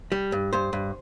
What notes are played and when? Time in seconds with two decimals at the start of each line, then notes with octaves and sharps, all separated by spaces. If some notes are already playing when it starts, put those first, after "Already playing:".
0.12 G3
0.32 G2
0.53 G2 C5
0.73 G2